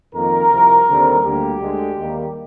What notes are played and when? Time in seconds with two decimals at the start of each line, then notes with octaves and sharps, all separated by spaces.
0.14 F2 D#3 A#3 A#4
0.51 C2 C3 F3
0.88 D#2 D3 G3 C4
1.24 D2 D3 G3 A#3 G4
1.61 D2 D3 G#3
1.98 D#2 D#3 G3 A#3